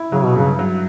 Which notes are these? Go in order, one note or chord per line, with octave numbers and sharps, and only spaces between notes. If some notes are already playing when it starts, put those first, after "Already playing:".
Already playing: E4
C#3 F#3
B2
G2 C#3
F#3